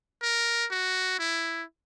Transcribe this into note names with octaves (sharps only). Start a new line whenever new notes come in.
A#4
F#4
E4